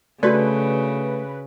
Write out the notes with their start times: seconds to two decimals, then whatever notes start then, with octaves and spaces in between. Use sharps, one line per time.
0.23 C#3 A3 D4 F#4 A4 B4 D5 A5